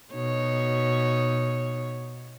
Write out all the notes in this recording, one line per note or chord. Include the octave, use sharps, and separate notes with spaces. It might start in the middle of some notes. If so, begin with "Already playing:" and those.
B2 D#4 C#5